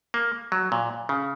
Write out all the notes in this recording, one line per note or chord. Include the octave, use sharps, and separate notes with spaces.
A#3
F#3
A#2
C#3